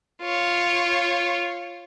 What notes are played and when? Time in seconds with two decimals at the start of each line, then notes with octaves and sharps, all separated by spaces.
0.22 F4 C#5